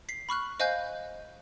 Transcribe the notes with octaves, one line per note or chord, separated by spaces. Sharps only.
B6 C7
B5 C#6 F6 F#6
C5 D#5 F5 G#5 F#6 G6